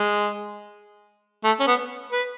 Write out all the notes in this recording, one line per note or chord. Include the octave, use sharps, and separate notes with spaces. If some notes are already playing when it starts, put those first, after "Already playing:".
Already playing: G#3
A3
C#4
B3
B4